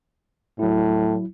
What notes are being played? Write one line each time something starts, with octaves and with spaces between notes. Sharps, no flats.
A2 F#3 E4